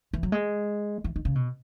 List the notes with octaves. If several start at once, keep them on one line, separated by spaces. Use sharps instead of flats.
E3
F#3
G#3
E3
D#3
C#3
B2